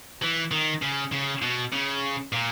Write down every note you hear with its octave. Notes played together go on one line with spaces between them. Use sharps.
E3
D#3
C#3
C#3
B2
C#3
A#2